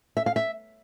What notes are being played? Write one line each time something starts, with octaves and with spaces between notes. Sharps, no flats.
E5
F5
E5